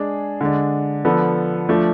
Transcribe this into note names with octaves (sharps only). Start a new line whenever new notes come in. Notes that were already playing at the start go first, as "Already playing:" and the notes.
Already playing: G#3 D4 G#4
D3 G#3 D4
D3 F3 B3 D4 A4
F3 A3 D4 F4